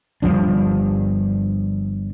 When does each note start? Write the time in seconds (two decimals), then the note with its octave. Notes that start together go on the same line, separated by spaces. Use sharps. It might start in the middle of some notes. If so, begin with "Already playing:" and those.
0.22 G1 G2 F3 D4